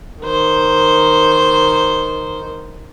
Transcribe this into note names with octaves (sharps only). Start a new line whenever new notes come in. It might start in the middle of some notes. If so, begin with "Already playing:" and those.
D#3 C5